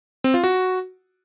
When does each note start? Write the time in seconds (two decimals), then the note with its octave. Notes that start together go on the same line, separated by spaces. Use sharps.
0.24 C4
0.34 F4
0.44 F#4